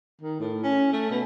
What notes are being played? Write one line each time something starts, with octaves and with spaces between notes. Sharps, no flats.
D#3
A2
C#4
A3
B2